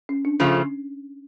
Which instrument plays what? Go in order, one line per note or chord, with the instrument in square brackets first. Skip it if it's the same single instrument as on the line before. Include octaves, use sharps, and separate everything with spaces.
[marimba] C#4
D4
[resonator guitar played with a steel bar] C#3 F3 A3 [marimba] C#4